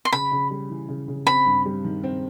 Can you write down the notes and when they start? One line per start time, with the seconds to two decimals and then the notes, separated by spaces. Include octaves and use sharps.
0.05 C6
0.13 C#3 B5
0.32 C#3
0.51 G3
0.70 E3
0.89 C#3
1.08 C#3
1.27 C4 B5
1.46 G2
1.66 G3
1.84 D#3
2.04 C4